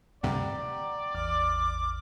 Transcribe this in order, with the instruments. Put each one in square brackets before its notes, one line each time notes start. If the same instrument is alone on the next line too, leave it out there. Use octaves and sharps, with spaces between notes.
[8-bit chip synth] D2 G2 C3 [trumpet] D5 [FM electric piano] F#5 G5 A#5
[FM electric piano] A1 E2 F6 [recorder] D6